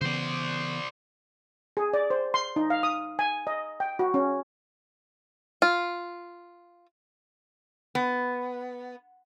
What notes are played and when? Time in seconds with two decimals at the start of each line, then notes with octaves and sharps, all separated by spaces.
0.01 C#3 E3 B3 C5 D5
1.77 G#4
1.94 D5
2.10 C5
2.34 C6
2.56 D#4
2.70 F5
2.83 D#6
3.19 G#5
3.47 D#5
3.80 G5
3.99 F#4
4.14 C#4
5.62 F4
7.95 B3